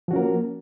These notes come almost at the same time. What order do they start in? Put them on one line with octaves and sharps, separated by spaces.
F3 F#4 C#4 A#4 A#3